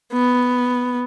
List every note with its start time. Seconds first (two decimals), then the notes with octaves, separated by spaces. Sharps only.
0.12 B3